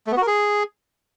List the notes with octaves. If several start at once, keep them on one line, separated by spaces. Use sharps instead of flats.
A3
B3
F#4
A#4
G#4